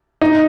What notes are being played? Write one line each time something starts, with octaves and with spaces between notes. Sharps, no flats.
D#4